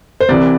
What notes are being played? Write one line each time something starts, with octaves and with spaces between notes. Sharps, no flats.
C5
C2 C3 E3 D5